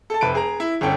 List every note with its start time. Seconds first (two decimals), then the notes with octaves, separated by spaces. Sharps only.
0.10 A4 A5
0.21 F1 B4 D7
0.35 G#4 A#5
0.60 E4
0.81 G1 C#4 A4 G5